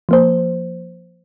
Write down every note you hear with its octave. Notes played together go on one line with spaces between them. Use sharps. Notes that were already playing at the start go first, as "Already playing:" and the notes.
F3 A#3 C5